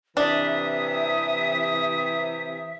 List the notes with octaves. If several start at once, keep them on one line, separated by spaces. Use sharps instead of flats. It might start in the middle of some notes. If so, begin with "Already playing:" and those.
C3 E3 D4 E5 D#6